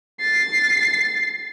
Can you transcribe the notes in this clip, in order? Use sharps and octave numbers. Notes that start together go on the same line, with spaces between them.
A6 C7